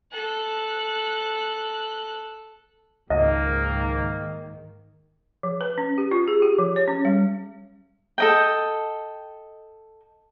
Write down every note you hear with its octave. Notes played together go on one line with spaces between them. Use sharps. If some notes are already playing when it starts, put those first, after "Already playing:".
A4 F#6
C#2 G#2 D#3 A#3 D#5
F3
B4
C#4
G4
F4
G#4
G4
F3
C#5
C#4
G3
A4 D#5 G5